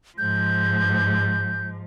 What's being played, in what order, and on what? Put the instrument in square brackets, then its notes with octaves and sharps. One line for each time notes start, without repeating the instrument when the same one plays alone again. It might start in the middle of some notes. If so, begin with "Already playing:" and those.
[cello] G#2 F3 [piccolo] G6